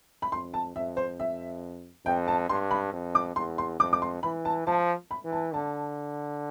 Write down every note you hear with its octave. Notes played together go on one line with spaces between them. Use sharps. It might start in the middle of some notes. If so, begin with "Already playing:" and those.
B5
F2 C6
A5
F2 E5
C5
E5
F2 G5
A5
G2 C6
B5
F2
D6
E2 C6
C6
F2 D6
D6
C6
E3 B5
A5
F3 A5
B5
E3
A5
D3 A5